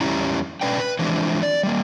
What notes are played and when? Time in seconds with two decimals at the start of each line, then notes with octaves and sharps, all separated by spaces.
0.01 E2 G3 C#4 E4 A#5
0.61 B2 C#4 B4 D5 G5
0.79 B4
0.99 E3 F3 G#3 C4 D4
1.43 D5
1.63 G3 A#3